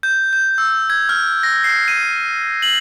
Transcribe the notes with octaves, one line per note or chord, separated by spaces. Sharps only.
G6
G6
E6
G#6
F6
A#6
C7
D#7
F#7